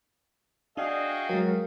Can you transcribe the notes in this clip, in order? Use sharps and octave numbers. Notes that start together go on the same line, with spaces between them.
D4 F#4 G#4 D#5 F5 G5
F#3 G#3 A#4